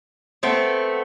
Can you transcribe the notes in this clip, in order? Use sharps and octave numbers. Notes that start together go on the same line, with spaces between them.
A3 B3 C4